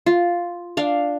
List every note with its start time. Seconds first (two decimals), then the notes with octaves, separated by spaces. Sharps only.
0.06 F4
0.77 D4 F5